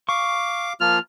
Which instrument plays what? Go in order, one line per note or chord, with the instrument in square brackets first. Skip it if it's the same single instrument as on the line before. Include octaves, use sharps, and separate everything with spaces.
[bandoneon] F5 D6 [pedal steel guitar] C#6
[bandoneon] F3 A#3 F4 [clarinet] F6